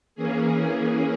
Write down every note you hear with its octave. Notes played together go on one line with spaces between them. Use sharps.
E3 A#3 C#4 G#4